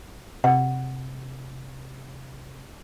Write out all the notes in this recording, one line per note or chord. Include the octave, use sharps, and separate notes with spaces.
C3 F#5